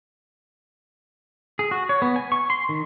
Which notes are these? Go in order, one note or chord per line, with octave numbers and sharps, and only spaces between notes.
G#4
F#4
C#5
B3
G#5
C#6
C6
D#3